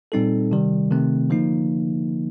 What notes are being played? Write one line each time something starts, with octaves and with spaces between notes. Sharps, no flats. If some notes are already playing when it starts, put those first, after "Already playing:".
A#2 G3 C4 D#4 A4
C3 D#3 G3
C3 D#3 A3 C4
D3 F3 A#3 D#4